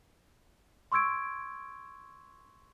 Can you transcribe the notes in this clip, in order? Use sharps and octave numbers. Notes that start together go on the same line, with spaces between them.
C6 C#6 E6 G#6 D7